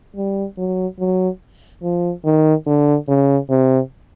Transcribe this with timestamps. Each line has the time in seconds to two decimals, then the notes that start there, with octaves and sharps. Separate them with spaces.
0.16 G3
0.58 F#3
0.99 F#3
1.83 F3
2.25 D#3
2.66 D3
3.08 C#3
3.50 C3